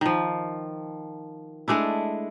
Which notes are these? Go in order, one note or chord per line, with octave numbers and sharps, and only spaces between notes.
D#3 F3
G#3 A3 D4 E4